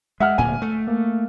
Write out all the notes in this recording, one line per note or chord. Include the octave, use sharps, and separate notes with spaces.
G#3 E5 F#5 F6
D1 A#2 G#5
A3
A#3